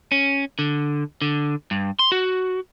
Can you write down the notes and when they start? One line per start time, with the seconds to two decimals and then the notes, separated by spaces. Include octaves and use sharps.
0.12 C#4
0.59 D3
1.22 D3
1.71 G2
1.99 C6
2.12 F#4